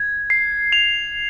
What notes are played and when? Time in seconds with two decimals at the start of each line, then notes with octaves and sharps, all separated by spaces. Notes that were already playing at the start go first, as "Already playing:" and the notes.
Already playing: G#6
0.30 C7
0.72 F7